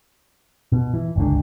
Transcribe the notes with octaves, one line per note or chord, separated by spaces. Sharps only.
B2
E3
G1 C#2 D3